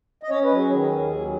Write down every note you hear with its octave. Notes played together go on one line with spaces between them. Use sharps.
D#5
C#4 C#5
B4
F#3
G#4
D#3
D#2
F#3